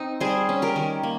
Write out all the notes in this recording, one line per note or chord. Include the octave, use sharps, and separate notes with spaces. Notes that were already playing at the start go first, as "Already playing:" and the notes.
Already playing: C4 D#4
G3 G#4 C5
C#4
G4 A#4
D#3
A#3